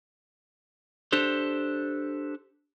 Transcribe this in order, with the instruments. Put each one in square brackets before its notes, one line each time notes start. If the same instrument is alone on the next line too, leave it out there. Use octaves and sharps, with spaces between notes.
[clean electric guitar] D4 G4 A4 C5